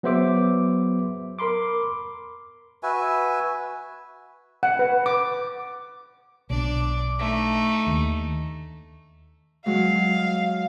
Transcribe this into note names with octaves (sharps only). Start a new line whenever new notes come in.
F#3 B3 G#4 C5 E5 D6
A#4 B5 C6 D6
F#4 B4 E5 G#5
F#5
B4
D6
B1 D4 D5
A3 D#4
D#2
F#3 G#3 F5